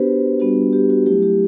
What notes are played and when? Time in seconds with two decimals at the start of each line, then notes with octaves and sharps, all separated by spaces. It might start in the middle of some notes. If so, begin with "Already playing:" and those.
Already playing: B3 D4 F#4 G4 B4 C5
0.40 G3 B3 D4 F#4
0.73 G4
0.90 F#4
1.06 F#3 A3 E4 G4
1.23 G4